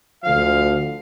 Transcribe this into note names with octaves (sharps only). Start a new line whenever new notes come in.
D2 D3 F3 F5